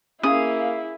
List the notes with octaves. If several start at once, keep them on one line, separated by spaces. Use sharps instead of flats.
A#3 C#4 E4 G#4 F5 D#6